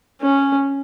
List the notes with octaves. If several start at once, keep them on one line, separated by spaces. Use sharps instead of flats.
C#4